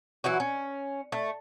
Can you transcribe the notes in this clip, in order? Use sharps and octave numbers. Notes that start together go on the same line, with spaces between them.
E3 F#3 E4 F#4
C#4
A3